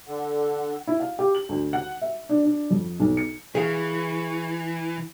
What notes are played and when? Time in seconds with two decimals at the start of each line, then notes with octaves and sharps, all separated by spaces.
0.07 D3 F#5
0.87 E4
1.00 F5
1.19 G4
1.35 F#7
1.49 D2
1.73 F#5
2.02 E5
2.29 D4
2.45 D4
2.71 F2
3.00 B1
3.17 C#7
3.55 E3 G#4 F5 C#6